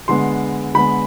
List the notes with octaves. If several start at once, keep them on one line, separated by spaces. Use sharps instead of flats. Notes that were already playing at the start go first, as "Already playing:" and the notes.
D3 G#3 B3 C6
D3 G#3 B3 B5